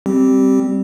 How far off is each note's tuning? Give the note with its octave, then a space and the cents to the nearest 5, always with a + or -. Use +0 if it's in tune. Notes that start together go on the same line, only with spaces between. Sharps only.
G3 +0 C4 +0 G4 -15